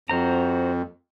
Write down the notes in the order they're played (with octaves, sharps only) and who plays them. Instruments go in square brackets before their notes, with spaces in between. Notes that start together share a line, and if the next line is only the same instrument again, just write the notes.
[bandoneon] F2 [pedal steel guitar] F#4 C5 A#5